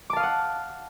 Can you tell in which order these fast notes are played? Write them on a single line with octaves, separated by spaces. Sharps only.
D6 A5 F5 D#6 F#5